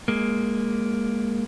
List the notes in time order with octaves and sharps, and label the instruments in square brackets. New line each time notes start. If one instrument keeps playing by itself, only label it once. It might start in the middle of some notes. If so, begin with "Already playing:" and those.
[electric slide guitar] G#3 A#3